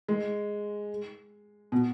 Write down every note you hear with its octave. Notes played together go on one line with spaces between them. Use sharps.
G#3
B2